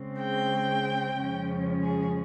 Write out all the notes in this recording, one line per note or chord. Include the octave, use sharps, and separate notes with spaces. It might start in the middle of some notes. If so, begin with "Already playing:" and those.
Already playing: C#3 G#3 C4
G5
F2 C#3 F3 G#3 C#4
G#4